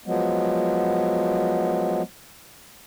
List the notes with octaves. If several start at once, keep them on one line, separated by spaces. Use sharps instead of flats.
F3 F#3 G#3 B3